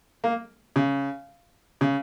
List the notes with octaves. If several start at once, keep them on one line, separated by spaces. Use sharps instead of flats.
A#3
C#3
C#3